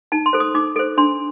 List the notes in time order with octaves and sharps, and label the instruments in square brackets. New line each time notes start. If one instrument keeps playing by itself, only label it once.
[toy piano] D#4 A5
C6
A4 C5
D#6
D#4 D6
A4 C5
D4 C6